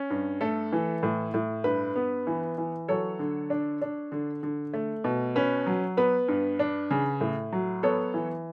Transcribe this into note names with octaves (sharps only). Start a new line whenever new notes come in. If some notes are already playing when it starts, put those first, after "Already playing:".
Already playing: C#4
G2
A3 A4
E3
A2
A2
G2 B4
B3
E3
E3
F#3 A4 C#5
D3
D4
D4
D3
D3
A3
B2
C#4 B4
F#3
B3 B4
G2
D4
C#3
A2
F#3
B3 A4 C#5
E3